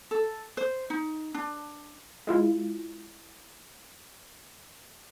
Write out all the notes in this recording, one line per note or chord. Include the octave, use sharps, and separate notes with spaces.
A4
C5
D#4
D4
G#3 E4 F4